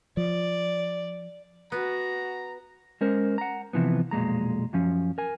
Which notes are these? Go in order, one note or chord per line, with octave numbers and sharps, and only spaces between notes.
F3 D5
B3 F#4 A#5
G#3 C#4 A#4 C5
F#5 A#5
C3 E3 F3 B3
B1 F2 A#2 G#3 A#5
F#2 F3 C#4
A#4 G#5